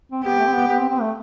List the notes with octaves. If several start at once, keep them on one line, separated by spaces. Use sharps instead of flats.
C4
B3 G4
A3
C4
B3
B3
C4
C4
A3